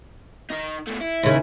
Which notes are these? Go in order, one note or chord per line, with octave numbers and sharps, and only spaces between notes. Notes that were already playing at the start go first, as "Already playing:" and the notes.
D#3 D#4
B2 A3
E4
D#2 C#3